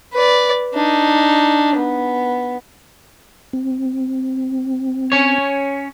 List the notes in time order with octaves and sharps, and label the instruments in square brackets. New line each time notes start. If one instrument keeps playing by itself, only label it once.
[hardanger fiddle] B4 D5
D4 D#4
B3
[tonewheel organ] C4
[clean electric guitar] C#4 C#5